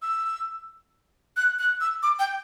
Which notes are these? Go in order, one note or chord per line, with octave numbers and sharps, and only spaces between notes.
E6
F#6
F#6
E6
D6
G5